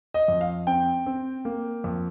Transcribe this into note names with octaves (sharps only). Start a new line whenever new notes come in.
D#5
F2
F5
C4 G5
C4
A#3
F2